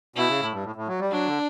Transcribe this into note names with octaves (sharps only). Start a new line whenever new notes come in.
B2 E4
C#3
A2
G2
A2
A2
F#3
G3
F#3 D4
D3